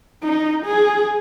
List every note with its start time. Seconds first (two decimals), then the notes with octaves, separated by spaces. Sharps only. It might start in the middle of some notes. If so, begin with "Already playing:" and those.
0.23 D#4
0.66 G#4